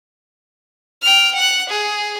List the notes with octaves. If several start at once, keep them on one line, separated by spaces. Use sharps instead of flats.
G5 F6
F#5 F#6
G#4